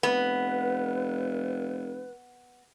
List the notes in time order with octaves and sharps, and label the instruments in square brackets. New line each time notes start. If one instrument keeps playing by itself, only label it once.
[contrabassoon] F1 [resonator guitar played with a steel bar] B3 [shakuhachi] B4